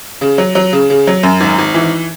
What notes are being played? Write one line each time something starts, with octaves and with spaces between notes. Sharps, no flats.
C#3
F#3
F#3
C#3
C#3
F#3
F#2
G#1
G#1
E3